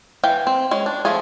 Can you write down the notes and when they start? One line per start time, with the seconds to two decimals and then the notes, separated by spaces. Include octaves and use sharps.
0.24 E3 F5 G5
0.47 C4
0.71 G#3 C#4
0.86 D4
1.05 F3 A3 F4 G#4